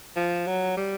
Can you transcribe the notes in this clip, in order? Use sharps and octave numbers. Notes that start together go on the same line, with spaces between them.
F3
F#3
G3